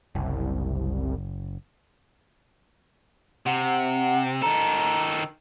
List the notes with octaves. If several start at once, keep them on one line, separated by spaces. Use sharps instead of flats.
F#1 C2
C3 F#5
D#3 A4 A#5